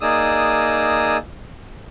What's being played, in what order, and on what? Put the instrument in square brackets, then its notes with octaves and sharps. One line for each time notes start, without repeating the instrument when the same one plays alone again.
[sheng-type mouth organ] A#3 D#4 G#4 D5 D#6 E6